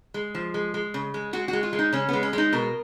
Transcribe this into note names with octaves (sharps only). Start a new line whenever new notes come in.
G#3
F3
G#3
G#3
C#3
G#3
G#3 F#4
G#3 F#4
F4
G#3
D#4
C#3 C#4
G#3 B3
C#4
G#3 D#4
B2 A#4